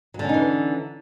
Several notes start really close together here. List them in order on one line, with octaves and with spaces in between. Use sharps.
F#3 D3 C#4 D#4 E3